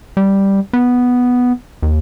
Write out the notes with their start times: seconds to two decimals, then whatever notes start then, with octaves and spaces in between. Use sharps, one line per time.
0.17 G3
0.73 B3
1.83 D#2